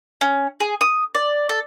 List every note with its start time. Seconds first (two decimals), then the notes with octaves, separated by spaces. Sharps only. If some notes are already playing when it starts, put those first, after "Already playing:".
0.21 C#4
0.60 G#4
0.81 D#6
1.15 D5
1.49 A4